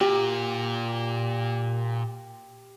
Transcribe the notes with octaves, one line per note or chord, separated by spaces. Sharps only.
A#2 G4